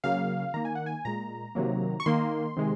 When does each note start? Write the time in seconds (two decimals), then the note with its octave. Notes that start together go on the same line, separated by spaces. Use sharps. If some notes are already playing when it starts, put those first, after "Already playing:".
0.04 C#3 F#3 A#3 F5
0.54 D#3 A#3 A#5
0.65 G#5
0.75 F#5
0.86 G#5
1.05 A#2 G#3 A#5
1.55 C3 D#3 F#3 A#3
2.00 C#6
2.06 D#3 A#3 C6
2.57 C3 D#3 G#3